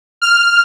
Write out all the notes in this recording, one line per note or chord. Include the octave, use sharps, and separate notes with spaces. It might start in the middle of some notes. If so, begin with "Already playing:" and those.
F6